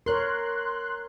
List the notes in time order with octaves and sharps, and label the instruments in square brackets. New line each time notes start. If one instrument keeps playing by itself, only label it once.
[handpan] A#4 C#5 [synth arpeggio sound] C6 F#6